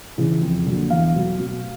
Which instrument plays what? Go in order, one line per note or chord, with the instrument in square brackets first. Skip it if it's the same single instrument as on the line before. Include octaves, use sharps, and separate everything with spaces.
[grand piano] C#3 E3
F2
D3 F#3 A#3
E2 F5
B2 F#3 A3
B2